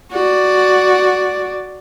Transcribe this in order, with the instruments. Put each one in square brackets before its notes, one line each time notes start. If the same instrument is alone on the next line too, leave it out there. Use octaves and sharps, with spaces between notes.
[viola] F#4 D5